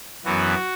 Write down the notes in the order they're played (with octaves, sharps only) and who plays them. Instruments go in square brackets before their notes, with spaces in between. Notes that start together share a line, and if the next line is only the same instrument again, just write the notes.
[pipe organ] F#2 E3 B3 F#4